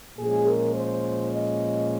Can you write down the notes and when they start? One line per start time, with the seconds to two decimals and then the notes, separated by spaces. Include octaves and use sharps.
0.18 A#2 F3 G#3 C#4 G#4
0.47 A#4
0.76 C5
1.33 D#5